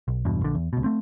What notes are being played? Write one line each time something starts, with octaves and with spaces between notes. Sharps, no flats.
B1
E2 G2 B2
A#1 D3
E2
C#2 B2
A3 C4